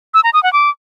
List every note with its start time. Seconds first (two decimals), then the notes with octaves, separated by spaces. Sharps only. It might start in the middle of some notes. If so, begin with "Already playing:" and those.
0.14 E6
0.24 A#5
0.33 D#6
0.43 F#5
0.53 D6